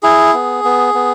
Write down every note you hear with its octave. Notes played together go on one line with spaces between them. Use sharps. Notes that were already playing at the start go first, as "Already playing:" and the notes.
E4 G#4
B3
B3
B3